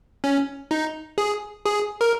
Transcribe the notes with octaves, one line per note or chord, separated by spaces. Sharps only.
C#4
D#4
G#4
G#4
A#4